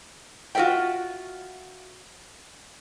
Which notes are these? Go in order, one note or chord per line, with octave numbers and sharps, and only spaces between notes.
F4 F#4 A4 D5 E5 G5